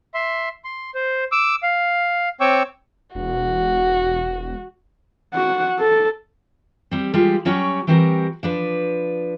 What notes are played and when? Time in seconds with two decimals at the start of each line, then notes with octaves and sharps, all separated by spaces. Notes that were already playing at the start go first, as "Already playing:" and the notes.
0.14 E5 C6
0.64 C6
0.95 C5
1.32 D6 E6
1.63 F5
2.40 C4 C#5 G5 C#6 D6 E6
3.15 E1 F#4
5.34 F#4 F#5
5.79 A4
6.91 G3 C4
7.14 G3 G#3 A#3 F4 G4
7.45 F#3 G3 C#4 F#4 C#5 G5
7.87 E3 G3 C4 F#4 G4 A#4
8.43 F3 D4 B4